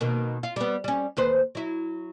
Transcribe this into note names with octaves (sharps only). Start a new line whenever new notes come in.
B2 D#3 A#3
F4
G3 B3
G3 C#4
D#2 B4 C5
F#3 E4